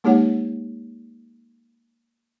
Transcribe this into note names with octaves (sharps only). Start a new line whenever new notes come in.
G#3 A#3 D#4 G4 C#5 F#5